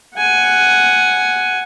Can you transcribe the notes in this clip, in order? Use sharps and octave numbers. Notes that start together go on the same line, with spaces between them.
F#5 G#5